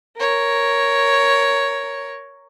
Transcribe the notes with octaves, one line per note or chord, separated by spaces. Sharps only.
A#4 C#5